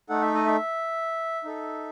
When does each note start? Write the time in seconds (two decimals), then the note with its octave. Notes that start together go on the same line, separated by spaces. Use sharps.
0.09 A3 D#4 A4 F#5
0.22 E5
0.34 D#5
0.46 E5
1.44 D#4 A4